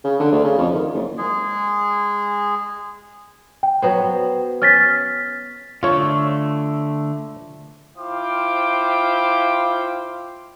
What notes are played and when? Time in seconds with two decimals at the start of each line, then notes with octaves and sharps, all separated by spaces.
0.04 C#3
0.20 D3
0.32 D2
0.44 C#3
0.58 F2
0.72 D#3
0.93 F#1
1.18 G#3 G#4
3.63 G5
3.82 F#3 B3 C5
4.62 C#4 G5 F6 A6 B6
5.83 D3 A3 F4 C#5 C#6
7.97 E4 F4 C5 F5 G5 D6